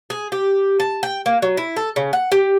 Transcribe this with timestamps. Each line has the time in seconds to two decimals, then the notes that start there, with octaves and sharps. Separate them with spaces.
0.10 G#4
0.32 G4
0.80 A5
1.03 G5
1.26 A#3
1.42 F#3
1.57 E4
1.76 A4
1.96 C#3
2.13 F#5
2.32 G4